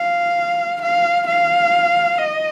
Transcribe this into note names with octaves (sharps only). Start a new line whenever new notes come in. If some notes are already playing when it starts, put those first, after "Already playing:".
Already playing: F5
F5
F5
D#5